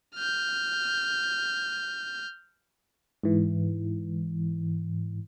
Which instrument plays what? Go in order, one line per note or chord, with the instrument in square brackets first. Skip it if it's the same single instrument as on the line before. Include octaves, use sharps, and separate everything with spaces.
[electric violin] F6 G6
[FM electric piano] G#2 E3